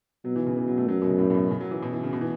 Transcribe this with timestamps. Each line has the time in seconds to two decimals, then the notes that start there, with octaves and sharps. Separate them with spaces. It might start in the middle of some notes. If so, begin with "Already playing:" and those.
0.25 B2 F#3
0.36 E3
0.47 C#3
0.57 E3
0.68 F#3
0.78 A3
0.88 F#2 F#3
1.02 B2
1.09 C#3
1.19 A2
1.30 A2
1.34 B2
1.51 C#3
1.61 F#3
1.71 E3
1.83 B2
1.93 E3
2.03 C#3
2.13 B2
2.21 E3